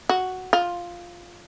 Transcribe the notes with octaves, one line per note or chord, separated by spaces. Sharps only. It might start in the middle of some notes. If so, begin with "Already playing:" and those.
F#4
F4